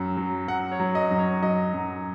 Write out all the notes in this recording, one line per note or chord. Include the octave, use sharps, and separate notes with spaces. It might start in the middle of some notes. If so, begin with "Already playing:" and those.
Already playing: F#2 F#3
F#3
F#2 F#5
C#5
F#3
D#5
F#2
C#5
F#3 D#5
F#2